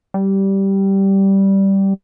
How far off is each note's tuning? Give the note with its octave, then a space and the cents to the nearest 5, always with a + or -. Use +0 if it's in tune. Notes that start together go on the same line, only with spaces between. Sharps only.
G3 -10